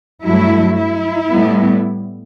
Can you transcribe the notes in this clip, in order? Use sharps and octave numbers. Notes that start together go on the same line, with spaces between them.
G2 F#3 A3 E4
E4
A2 G3 B3